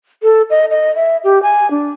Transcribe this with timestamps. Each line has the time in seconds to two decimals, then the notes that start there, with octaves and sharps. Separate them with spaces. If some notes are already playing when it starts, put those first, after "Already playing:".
0.23 A4
0.50 D#5
0.70 D#5
0.96 E5
1.24 G4
1.43 G#5
1.71 D4